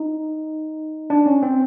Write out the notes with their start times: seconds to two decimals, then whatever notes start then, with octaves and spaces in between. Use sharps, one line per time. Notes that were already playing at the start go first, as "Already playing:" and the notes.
Already playing: D#4
1.10 D4
1.26 C#4
1.43 C4